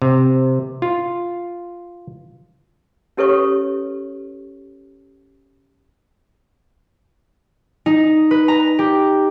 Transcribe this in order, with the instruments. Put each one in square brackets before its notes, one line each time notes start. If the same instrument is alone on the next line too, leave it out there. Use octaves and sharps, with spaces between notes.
[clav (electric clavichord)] C3
F4
[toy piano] C#4 G4 A4 B4 C#5 C#6
[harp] D#4
B4
A#5
G4